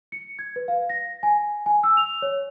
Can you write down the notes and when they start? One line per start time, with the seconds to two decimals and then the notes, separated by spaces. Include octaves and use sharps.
0.12 C#7
0.39 G#6
0.56 B4
0.68 F5
0.89 A#6
1.23 G#5
1.66 G#5
1.83 E6
1.97 F7
2.22 C#5